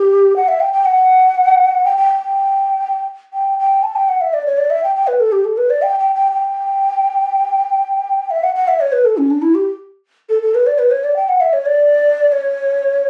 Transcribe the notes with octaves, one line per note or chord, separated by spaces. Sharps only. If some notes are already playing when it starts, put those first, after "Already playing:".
Already playing: G4
F#5
E5
G5
G5
F#5
G5
G5
G5
G5
G5
A5
G5
F#5
E5
D5
C#5
D5
E5
G5
G5
B4
A4
G4
A4
B4
D5
G5
G5
G5
G5
E5
F#5
F#5
E5
C#5
B4
A4
C#4
D4
E4
G4
A4
A4
B4
D5
B4
C#5
D5
G5
F#5
E5
C#5
D5
D5
C#5